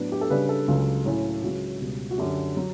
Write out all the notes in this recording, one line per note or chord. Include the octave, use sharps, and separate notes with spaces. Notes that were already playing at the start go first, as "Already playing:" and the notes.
Already playing: A2 F#3 B3 D4
G4
A4
C#3 G3 D4 B4
A4
C#2 C#3 F#3
A2 F#3 C#4 E4
C#2 C#3 F#3 F#4
C#2 B2 G3
F#4
F#2 D3 F#3 G4
F#3